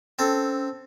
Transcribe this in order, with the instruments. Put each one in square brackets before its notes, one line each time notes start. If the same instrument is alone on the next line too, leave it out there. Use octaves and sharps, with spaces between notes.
[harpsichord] C4 A4 [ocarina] C#4